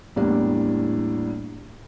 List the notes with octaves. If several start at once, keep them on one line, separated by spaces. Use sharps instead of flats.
E2 A2 G3 A#3 D4